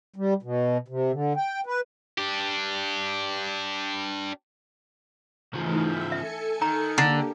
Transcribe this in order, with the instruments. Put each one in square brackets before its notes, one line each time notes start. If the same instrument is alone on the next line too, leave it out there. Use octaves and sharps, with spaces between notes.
[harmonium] G3
B2
C3
D3
G5
B4
[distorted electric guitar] D4 G4
[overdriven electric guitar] C#3 F3 [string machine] E3 A3 D#4
[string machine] E5
[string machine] A4 G#5 C#7 [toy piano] E5
[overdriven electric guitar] D#3 [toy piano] A#5
[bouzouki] D3 [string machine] A#3 G4 [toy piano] A#5